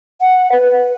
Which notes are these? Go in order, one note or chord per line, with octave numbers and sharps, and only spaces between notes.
F#5
B4